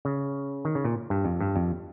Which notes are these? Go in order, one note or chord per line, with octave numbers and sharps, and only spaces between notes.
C#3
D#3
C#3
A#2
G2
F2
G2
F2